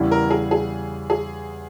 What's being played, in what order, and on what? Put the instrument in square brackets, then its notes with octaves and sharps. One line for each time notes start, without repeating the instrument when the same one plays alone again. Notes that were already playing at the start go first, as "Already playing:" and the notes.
Already playing: [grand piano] E2 C#3 G3 C#4 E4
[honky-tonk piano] A#4
G#4
G#4
G#4